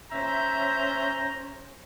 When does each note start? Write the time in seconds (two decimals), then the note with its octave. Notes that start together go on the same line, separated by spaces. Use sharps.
0.12 C#4 C5 E5 A#5 G6